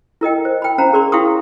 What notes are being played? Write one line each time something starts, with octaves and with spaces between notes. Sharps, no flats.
E4 A#4 D#5 G5
C5
G5 B5
C#4 C5 F5 A#5 B5
G#4 A#4 D5 C6
E4 F5 G5 C6 C#6 D#6